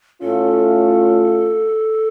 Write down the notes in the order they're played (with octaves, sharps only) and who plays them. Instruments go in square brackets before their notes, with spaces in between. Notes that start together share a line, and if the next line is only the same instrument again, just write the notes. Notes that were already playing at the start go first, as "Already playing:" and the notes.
[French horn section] A2 A3 C#4 F4 [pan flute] A4